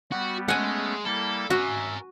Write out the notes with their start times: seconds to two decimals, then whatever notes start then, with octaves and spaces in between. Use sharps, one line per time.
0.12 G3 B3 F#4
0.48 G#3 A3 B3 C#4 F#5 G#5
1.05 G3 A#3 E4 A4
1.50 F#4 A#4 E5 G#5